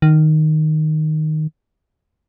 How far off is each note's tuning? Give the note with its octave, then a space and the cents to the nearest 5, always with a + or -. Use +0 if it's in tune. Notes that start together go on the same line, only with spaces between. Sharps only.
D#3 -5